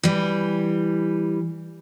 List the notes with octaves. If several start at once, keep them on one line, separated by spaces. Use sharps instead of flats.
E3 G3